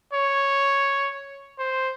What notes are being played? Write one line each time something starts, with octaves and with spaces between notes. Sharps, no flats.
C#5
C5